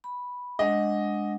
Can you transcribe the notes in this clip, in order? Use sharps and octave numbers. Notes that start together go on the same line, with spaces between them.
B5
G#3 D4 D#5 F#5